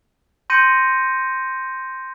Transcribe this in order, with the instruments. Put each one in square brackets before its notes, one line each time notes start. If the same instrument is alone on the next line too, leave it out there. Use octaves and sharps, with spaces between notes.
[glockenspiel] C6 G6 A#6 C#7 D#7